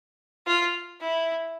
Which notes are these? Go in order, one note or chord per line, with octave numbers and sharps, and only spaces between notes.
F4
E4